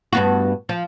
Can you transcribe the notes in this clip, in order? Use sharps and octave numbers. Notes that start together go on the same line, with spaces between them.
G2 B3 F#4
F3